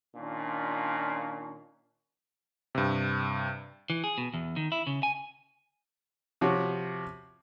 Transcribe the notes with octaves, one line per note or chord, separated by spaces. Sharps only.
A#2 D#3 C#4 D4 F4
G2 C3
E3
G#4
B2
E2
D#3
E4
C#3
G#5
C3 F3 F#4 C#5